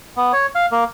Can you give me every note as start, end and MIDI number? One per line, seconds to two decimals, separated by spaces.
0.17 0.32 59
0.33 0.46 73
0.55 0.66 77
0.72 0.84 58